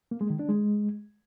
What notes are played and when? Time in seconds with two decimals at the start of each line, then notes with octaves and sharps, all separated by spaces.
0.11 A#3
0.21 G#3
0.30 D#3
0.39 D4
0.49 G#3